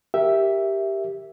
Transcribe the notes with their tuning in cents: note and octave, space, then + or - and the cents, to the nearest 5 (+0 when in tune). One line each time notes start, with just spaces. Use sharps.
G4 +0 A#4 +0 E5 +0